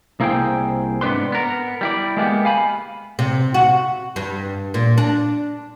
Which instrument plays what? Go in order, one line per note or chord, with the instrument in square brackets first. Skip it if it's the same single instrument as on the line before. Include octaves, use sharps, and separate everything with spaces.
[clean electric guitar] C2 A#3 E4 G#4 C5 G5
G#2 B3 C4 D4 B4 C6
B3 A#4
G3 E4 D5
G#3 A#3 B3 G4
F5 G#5 B5
[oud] C3
F#4
G2
A#2
D4